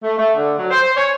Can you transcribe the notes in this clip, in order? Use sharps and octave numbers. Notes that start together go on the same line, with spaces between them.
A3
A3
D3
F#3
C5
C#5